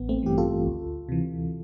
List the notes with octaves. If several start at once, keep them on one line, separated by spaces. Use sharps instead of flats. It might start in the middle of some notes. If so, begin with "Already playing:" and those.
Already playing: A1 B3
A3 C4
G2 E3 G4
F4 A4
D2
C3 E3